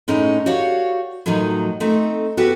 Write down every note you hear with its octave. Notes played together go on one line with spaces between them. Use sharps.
A2 G#3 C#4 D#4
F#4 G4 C#5 D5 F5
A2 D#3 F3 F#3 D#4
A3 C4 D#4
B3 F#4 G4 A4 B4